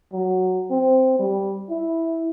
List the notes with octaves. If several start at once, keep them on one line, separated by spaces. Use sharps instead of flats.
F#3
C4
G3
E4